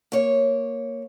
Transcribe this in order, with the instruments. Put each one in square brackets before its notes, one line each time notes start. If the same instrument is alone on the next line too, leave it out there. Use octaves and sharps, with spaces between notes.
[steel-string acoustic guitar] A#3 C#5